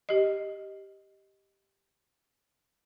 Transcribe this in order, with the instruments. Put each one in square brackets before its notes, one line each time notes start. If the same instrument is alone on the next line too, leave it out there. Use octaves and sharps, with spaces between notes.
[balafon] G4 D#5